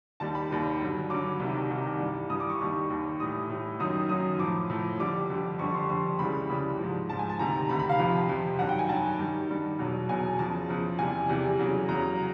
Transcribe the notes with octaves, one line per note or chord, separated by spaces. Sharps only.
D#2 D#3 G3 A5
B5
D#2 D#3 G3
G2 D3 F#3
G2 D3 F#3 D6
C2 C3 D#3
C2 C3 D#3
G2 E3 G3
G2 E3 G3 D#6
D6
C#6
D#2 D#3 G3
D#2 D#3 G3
A2 E3 G3 D#6
A2 E3 G3
F#2 D#3 F#3 D#6
F#2 D#3 F#3 D#6
A2 F3 D6
A2 F3
F2 D3 G3 D6
F2 D3 G3
F2 D3 G3 C#6
C6
F2 D3 G3 C6
C#2 C#3 E3 G3 B5
C#2 C#3 E3 G3
G#2 F3
G#2 F3 A5
G#5
A5
D2 C3 D#3 A#5
D2 C3 D#3 B5
B5
F5
F2 C3 F3
F2 C3 F3
G2 D#3 F#3 F#5
G5
G#5
G2 D#3 F#3 A5
G2 D#3 G3
G2 D#3 G3
E2 B2 F#3
E2 B2 F#3 G#5
E2 C#3 F3 A5
E2 C#3 F3
E2 C3 E3 G3 G#5
E2 C3 E3 G3
E2 C#3 F#3
E2 C#3 F#3 A#5